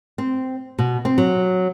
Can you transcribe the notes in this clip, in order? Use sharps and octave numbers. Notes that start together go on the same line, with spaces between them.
C4
B2
C4
F#3